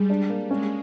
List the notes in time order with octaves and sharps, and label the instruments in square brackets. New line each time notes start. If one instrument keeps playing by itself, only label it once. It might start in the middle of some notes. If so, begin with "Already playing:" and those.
Already playing: [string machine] G3 [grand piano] G#3
[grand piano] D4
A#3
[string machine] G#3 [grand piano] C#4